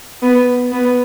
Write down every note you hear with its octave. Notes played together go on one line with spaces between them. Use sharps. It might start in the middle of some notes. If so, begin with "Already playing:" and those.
B3
B3